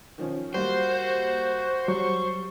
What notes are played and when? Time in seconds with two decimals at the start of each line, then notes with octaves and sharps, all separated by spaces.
0.18 D#3 F3 C#4
0.54 G3 A#3 F#4 C5
1.88 F#3 G3 C#6